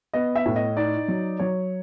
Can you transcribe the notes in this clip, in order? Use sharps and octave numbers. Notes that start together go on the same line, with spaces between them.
B3 D#5
E5
A2
D#5
D#4 D5
F#3
F#3 C#5